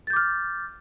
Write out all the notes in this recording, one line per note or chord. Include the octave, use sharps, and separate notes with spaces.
D6 F6 G6 A6